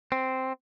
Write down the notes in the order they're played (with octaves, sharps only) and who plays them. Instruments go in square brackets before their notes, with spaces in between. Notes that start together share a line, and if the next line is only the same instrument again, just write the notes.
[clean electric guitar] C4